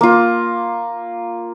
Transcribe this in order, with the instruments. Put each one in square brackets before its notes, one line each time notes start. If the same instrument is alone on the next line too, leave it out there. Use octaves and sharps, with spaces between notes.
[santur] A#3 F4